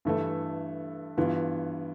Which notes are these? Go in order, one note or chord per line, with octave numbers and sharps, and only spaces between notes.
G2 E3 A3 E4 A4
G2 E3 B3 F4